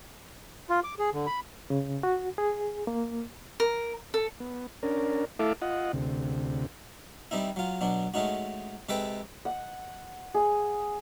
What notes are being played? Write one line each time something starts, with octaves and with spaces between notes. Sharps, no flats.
F4
D6
G#4
D3
B5
C#3
F#4
G#4
A#3
A#4
A4
B3
C#4 D4 A#4
A3 E4 A4 E5 F5 D6
F4 D#5 F#5
D2 C3
G3 C4 D#4 E4
F#3 F4
B2 F#3 D4
G#3 A3 C#4 D#4 F#4
C3 G#3 A4 B4 G5 A5
F#5
G#4